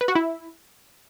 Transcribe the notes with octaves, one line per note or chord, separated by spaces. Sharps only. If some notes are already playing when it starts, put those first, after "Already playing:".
B4
F#4
E4